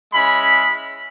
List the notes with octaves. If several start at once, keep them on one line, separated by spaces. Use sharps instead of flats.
G#3 C#4 E4 B5